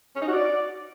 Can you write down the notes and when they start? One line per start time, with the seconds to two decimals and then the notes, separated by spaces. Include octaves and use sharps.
0.15 C#4
0.21 D#4
0.27 F#4
0.33 D5